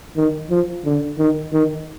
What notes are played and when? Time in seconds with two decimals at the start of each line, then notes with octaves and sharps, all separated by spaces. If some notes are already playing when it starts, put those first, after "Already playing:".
0.16 D#3
0.50 F3
0.85 D3
1.18 D#3
1.53 D#3